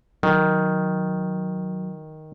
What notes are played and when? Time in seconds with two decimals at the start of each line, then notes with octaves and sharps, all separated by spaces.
0.23 D#3 F#3